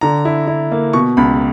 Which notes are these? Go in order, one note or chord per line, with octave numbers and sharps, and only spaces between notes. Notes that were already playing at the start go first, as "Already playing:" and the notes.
D3 A#5
E4
E4
A#3
B2 C#6
C#2 B5